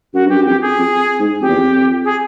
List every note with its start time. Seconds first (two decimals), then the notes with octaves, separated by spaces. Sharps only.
0.14 F#2 F#4
0.25 G2 G4
0.34 F#2
0.45 F2 G4
0.61 G#4
0.78 F2
1.20 G#2
1.41 F2 G4
1.48 E2
1.57 F2
2.04 G#4